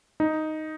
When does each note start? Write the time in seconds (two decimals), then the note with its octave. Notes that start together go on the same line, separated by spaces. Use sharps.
0.20 D#4